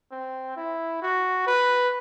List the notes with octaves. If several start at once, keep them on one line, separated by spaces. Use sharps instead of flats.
C4
E4
F#4
B4